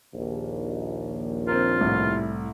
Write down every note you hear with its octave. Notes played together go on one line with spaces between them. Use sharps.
A#1 D#2
C4 F4 A#4
C2 A2